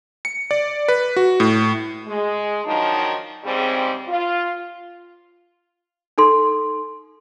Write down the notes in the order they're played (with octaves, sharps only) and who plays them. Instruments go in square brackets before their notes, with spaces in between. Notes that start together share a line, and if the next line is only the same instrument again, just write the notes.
[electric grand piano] C#7
D5
B4
F#4
A2
[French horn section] G#3
D#3 F3 F#3 D4 D#4
G#2 C#3 G3 C4
F4
[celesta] D#4 A4 C6